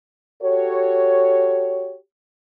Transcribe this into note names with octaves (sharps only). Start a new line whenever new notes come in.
F#4 G4 A4 C#5